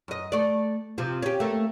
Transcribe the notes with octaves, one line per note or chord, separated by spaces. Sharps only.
F#2 D#5
A3 D5
C3 F3
C#4 G4
A3 A#3